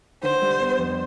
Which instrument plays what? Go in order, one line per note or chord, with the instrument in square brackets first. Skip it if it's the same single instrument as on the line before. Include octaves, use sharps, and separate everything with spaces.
[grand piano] D3 [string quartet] C5
[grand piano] G3
B3
F2